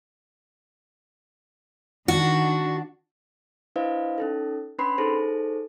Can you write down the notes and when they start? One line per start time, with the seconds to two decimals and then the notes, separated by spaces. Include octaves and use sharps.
2.08 D#3 D4 F#4
3.76 D4 E4 B4 C5 D#5 F5
4.18 C#4 D#4 A4
4.79 C#4 D4 B4 B5 C6 C7
4.98 D#4 G#4 A4 C5